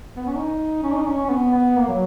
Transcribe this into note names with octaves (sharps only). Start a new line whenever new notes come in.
B3
C#4
D#4
C#4
D#4
C#4
C#4
B3
B3
A#3
F#3